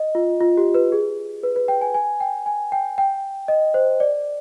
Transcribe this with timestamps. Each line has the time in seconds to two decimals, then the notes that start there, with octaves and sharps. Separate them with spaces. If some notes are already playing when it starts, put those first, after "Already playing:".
Already playing: D#5
0.15 F4
0.41 F4
0.57 G4
0.74 B4
0.92 G#4
1.43 B4
1.56 B4
1.68 G5
1.81 G#5
1.94 G#5
2.20 G5
2.46 G#5
2.72 G5
2.98 G5
3.48 D#5
3.74 C5
4.00 D5